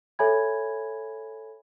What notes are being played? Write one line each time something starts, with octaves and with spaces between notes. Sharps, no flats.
A4 C#5 E5 G#5 B5 G#6